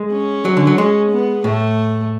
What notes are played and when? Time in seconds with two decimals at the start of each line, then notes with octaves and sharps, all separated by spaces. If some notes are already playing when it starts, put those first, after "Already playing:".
Already playing: G#3
0.13 C#4
0.45 F#3
0.57 D3
0.67 F#3
0.78 G#3
1.11 B3
1.44 A2 A3